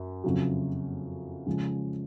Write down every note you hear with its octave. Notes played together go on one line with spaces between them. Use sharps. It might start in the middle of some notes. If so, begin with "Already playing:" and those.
Already playing: F#2
F2 C#3 F#3
C#3 F3 G#3